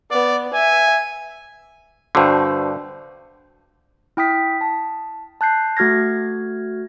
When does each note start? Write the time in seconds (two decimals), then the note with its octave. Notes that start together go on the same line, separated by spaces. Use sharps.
0.11 B3 D5
0.54 E5 G#5
2.15 G2 D3 D4 F#4 C5
4.17 E4 G5 D#6 B6
4.61 A5
5.41 A5 F#6 G6 C7
5.77 A3 F#4 F6 G#6 A#6